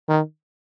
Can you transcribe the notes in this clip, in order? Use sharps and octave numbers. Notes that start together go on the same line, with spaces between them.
D#3